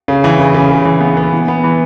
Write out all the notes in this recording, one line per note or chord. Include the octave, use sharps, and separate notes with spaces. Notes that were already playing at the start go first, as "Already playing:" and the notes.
C#3
E3
C#3
C#3
C#3
E3
B3
B3
E3
B3
E3